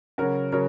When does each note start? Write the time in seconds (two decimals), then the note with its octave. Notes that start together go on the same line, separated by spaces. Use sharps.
0.18 C#3 F#3 C#4 F#4 A#4
0.52 C#3 F#3 A#4 C#5